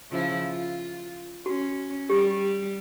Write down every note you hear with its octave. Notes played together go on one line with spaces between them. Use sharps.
C#3 F3 E4
F4
C#4 F#4
G3 G4